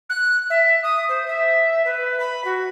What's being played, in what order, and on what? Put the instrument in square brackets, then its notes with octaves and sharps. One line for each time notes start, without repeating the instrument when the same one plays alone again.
[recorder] F#6
E5
D#6
C5
E5
B4
B5
F#4